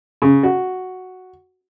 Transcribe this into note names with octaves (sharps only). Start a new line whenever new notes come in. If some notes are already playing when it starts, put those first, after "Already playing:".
C#3
F#4